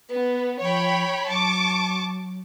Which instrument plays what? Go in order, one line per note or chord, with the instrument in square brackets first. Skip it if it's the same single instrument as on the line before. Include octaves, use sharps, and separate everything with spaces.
[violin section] B3 [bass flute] B4
[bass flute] F3 [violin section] C#5 G5 B5
[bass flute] F#3 [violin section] A5 C#6 D6